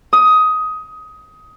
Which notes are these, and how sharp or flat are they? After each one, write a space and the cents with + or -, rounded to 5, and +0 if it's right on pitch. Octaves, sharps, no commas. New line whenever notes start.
D#6 +15